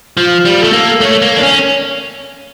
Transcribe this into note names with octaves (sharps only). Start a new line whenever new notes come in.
F3 F4
G3
A3 A4
A#3
A3 C#5
A#3
D4
C#4